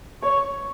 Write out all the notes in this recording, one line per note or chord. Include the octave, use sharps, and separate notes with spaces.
C#5 C#6